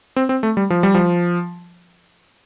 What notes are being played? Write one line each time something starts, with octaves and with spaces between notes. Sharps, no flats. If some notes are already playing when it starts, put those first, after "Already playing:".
C4
C4
A3
G3
F3
G3
F3